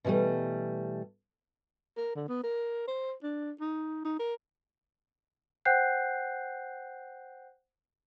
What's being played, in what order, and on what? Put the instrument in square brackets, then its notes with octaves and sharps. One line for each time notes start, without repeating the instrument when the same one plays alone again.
[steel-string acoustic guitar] B2 E3 F3 G3 A3
[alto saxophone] A#4
D3
B3
A#4
C5
D4
D#4
D#4
A#4
[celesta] C5 F#5 G5 F#6 G6 C7